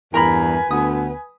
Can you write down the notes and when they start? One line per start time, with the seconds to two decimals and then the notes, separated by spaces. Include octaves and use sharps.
0.14 E2 G2 A#4 B4 G#5 A#5 B5
0.71 D2 B3 D#6